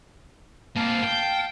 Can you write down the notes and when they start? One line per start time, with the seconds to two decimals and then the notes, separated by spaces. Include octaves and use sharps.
0.77 A#3 C4 F5 A5
1.04 G5